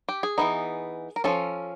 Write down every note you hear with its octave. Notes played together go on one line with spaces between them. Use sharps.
G4
G#4
E3 G3 B3 D#4
A#4
F3 A3 C#4 A4